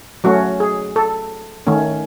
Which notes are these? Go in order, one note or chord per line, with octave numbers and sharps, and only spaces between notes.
F#3 A3 C#4 F#4
G#4
A4
D#3 A3 C#4